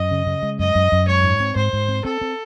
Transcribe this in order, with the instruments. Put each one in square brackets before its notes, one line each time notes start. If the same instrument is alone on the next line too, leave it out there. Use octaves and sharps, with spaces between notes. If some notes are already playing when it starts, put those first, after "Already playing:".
Already playing: [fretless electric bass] F#2 [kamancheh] D#5
[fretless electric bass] C#3
C#3
G#3
[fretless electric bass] F#2 [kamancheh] D#5
[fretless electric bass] F#2
F#2
[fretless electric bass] G#3 [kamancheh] C#5
[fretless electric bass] G#2
C4
[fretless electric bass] G#2 [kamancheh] C5
[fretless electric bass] G#2
C4
[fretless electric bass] C4 [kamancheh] A4
[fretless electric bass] C4